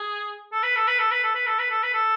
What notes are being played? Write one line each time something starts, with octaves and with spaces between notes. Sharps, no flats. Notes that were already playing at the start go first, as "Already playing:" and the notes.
Already playing: G#4
A4
B4
A4
B4
A4
B4
A4
B4
A4
B4
A4
B4
A4